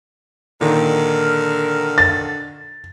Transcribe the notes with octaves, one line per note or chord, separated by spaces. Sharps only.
A#2 D3 D#3 A#4
A6